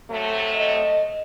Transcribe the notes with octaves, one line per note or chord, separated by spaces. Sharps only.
C3 F#3 A3
D#5